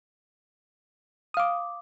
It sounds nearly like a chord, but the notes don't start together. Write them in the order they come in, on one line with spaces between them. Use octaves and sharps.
D#6 F5 D6